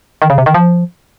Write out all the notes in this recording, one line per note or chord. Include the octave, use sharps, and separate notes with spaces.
D#3
C#3
C3
D#3
F3